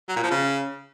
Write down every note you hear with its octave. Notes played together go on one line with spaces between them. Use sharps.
F#3
A#2
F3
C#3